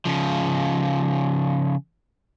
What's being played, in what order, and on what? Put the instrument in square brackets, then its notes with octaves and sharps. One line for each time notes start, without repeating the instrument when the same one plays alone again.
[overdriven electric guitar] C#3 F3